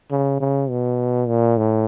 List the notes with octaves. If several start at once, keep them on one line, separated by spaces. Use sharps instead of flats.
C#3
C#3
B2
A#2
A2